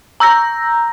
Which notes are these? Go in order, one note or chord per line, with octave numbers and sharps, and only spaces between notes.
A#5 E6 G6 A#6